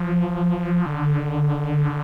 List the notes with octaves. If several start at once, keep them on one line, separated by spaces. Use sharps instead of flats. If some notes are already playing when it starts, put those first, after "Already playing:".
Already playing: F3
D3